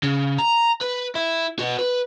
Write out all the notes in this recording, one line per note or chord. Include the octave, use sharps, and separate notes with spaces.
C#3
A#5
B4
E4
B3 F#4
B4